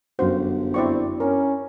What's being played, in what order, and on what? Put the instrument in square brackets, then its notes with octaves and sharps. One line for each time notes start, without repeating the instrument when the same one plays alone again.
[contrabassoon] G1 [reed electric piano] F#2 F#4 [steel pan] C5 F5
[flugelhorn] C4 [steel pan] E4 D5 C#6
[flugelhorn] C#4 [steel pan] A#4